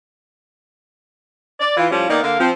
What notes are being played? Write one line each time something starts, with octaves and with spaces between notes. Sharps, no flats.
D5
E3 F4
A2 F3 G3 C#4 F4
D#3 A#3 B3 D#4 A#4 D5
D3 A#3 A#4 F5
F3 C4